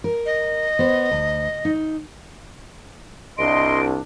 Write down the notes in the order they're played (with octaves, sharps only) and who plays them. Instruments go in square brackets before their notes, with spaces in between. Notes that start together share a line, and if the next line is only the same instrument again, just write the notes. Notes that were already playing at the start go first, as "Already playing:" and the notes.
[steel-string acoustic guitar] A#4
[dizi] D#5
[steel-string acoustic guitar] B3 C5
D2
D#4
[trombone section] C2 [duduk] D4 [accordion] D#5 C6 [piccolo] D7